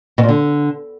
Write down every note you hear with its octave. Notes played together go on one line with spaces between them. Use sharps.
B2
A#2
D3